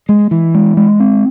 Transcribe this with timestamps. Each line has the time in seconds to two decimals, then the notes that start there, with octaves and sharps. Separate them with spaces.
0.09 G#3
0.31 E3
0.54 G#3
0.77 G#3
1.00 C4